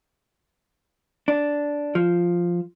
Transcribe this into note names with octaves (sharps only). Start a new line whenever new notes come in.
D4
F3